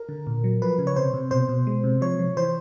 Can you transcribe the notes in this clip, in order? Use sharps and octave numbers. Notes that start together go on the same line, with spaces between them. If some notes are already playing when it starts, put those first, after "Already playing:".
Already playing: A#4
D3
A#2
F#3
F3 B4
C#3
C#5
C3 C5
C3
B2 C5
B2
G#3
C3
F3 C#5
F3
E3 C5